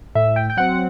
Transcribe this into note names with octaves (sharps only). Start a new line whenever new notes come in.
A2 E5
G5
G5
F#3 C4 F#5